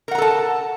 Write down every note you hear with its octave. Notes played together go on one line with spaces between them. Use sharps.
A4 A#4 F#5 A5 A#5